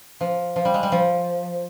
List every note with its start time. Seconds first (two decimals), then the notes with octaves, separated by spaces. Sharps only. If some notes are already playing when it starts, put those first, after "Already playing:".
0.21 F3
0.56 F3
0.65 G3
0.74 G#3
0.83 G3
0.92 F3